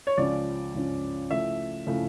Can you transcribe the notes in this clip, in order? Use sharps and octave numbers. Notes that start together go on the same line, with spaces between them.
C#5
C#2 C#3 F3 C#4 D5
C#2 C#3 F3 C#4
C#3 F3 A3 E4 E5
C#3 F3 A3 E4